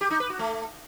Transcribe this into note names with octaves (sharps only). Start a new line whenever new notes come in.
G4
D#4
B4
F#4
A3